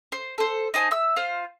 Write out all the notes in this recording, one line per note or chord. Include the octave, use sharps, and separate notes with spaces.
C5
A4 C5
D#4 C5 G#5 A5
E5 E6
F4 C5 F5